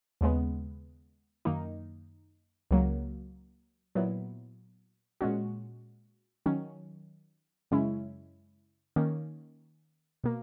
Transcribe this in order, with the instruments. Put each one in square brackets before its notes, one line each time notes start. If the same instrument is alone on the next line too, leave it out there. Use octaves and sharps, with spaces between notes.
[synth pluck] D#2 C#3 G#3 B3
F#2 D#3 A#3 D#4
C#2 C#3 F#3 A#3
A#2 F#3 B3 E4
A#2 G#3 C#4 F#4
D#3 F#3 C#4
F#2 C#3 G#3 C#4 E4
D#3 A#3 C#4
B2 A#3